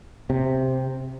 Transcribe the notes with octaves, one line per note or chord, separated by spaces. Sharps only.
C3